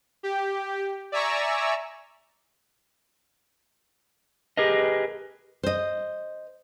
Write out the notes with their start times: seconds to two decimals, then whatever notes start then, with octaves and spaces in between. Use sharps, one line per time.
0.23 G4
1.12 D5 E5 G#5 A#5 C#6 E6
4.57 G4 G#4 A#4 B4 D#5
5.63 C5 D#5